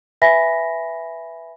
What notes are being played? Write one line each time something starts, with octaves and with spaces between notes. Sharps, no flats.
B4 E5 G#5 B5 A#6 B6